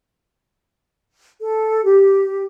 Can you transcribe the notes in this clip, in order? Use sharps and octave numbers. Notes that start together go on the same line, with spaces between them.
A4
G4